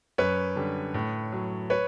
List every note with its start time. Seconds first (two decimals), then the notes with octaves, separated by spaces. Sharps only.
0.18 F#2 B4 C#5
0.56 D3 G3
0.94 A2
1.32 F#3
1.70 B4 C#5